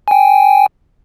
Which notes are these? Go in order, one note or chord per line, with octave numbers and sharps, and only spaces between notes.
G5 G#5